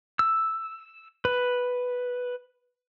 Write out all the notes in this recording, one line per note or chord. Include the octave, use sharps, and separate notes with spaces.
E6
B4